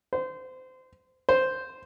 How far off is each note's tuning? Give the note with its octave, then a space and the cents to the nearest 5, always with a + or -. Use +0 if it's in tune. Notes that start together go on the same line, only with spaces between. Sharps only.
C5 -25
C5 -5